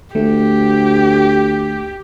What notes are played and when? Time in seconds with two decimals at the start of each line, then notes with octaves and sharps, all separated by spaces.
0.15 D2 A3 G4